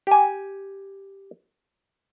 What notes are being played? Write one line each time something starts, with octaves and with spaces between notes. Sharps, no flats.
G4 G#5